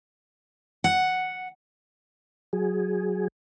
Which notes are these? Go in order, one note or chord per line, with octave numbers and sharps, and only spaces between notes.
F#5
F#3 G#4